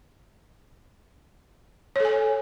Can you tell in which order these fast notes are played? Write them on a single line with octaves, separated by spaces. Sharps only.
C#5 A4 G#5